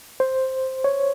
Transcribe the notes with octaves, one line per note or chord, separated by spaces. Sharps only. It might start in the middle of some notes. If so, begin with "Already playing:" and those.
C5
C#5